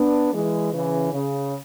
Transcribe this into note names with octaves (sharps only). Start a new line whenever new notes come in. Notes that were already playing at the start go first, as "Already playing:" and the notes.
Already playing: B3 D4
E3 G#3
C#3 E3
C#3